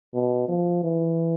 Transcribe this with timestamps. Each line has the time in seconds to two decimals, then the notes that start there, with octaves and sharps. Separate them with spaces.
0.14 B2
0.48 F3
0.83 E3